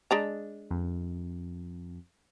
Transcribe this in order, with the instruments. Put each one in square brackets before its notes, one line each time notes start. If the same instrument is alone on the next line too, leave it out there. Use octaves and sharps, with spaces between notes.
[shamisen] G#3 D4 A#5
[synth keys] F2